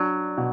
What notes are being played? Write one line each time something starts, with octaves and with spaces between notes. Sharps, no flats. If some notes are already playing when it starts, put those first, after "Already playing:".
Already playing: F#3 D4
B2